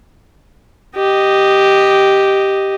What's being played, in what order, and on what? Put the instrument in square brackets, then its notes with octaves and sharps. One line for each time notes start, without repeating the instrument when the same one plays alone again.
[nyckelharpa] G4 D#5